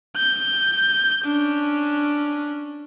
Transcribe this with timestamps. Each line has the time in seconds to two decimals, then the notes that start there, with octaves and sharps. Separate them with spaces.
0.16 G6
1.25 C#4 D4